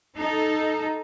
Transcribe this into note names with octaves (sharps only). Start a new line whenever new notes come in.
D#4 A4